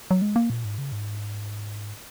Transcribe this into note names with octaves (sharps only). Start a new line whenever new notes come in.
F#3
G#3
A#3
A#2
G#2
C#3
G#2